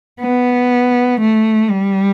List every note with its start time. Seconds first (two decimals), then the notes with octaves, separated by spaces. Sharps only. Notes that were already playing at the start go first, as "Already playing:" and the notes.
0.21 B3
1.20 A3
1.70 G3